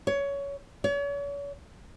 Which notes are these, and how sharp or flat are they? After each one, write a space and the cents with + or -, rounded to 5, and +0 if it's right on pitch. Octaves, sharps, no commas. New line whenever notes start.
C#5 +20
C#5 +40